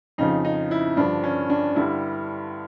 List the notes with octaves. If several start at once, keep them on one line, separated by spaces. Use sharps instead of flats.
F2 C#3 F3 D#4
D#4
E4
G2 D3 F3 D4
C#4
D4
G2 D3 G3 E4